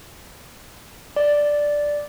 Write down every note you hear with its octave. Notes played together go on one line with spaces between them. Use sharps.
D5